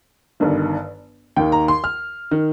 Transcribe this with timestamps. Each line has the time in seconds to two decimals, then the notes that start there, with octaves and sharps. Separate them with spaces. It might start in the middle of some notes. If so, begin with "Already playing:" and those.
0.40 G1 G2 D#3
1.36 D#2 D#3 G5
1.52 A#5
1.68 C6
1.84 F6
2.31 D#3